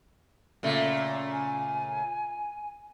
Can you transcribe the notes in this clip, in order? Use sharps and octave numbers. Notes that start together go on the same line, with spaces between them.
A#2 C#3 A3
G#5